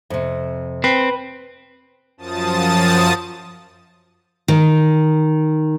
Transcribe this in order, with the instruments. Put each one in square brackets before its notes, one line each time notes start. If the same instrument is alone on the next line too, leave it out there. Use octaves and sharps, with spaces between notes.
[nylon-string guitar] F2 C3
[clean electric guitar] C4 [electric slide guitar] B4
[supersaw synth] F#2 F3 A5 D#6 A6
[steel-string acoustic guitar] D#3